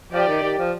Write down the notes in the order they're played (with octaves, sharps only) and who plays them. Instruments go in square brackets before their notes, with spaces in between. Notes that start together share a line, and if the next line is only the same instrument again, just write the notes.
[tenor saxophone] F3 [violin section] G4 D5 G5
[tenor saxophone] D#3
D#3
F3